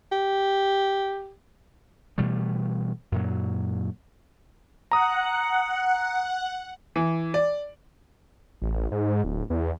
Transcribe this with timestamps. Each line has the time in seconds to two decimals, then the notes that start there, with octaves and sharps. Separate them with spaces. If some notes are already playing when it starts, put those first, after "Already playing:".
0.12 G4
2.18 B2 E3 G3 A3
3.12 F#2 A#2 F#3
4.91 F#5 A#5 D#6
6.96 E3
7.34 D5
8.62 A1
8.91 G#2
9.24 D1
9.50 E2